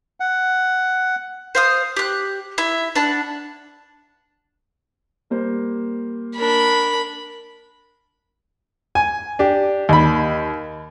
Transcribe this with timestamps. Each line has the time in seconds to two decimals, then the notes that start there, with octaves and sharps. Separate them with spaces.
0.20 F#5
1.55 C5 F5 D#6
1.96 G4 F#6
2.58 E4 E5
2.95 D4 F#5 A5 B5
5.30 G3 A#3 C5
6.38 D4 A#4 B5
8.95 G#5
9.39 D4 G4
9.89 D#2 B5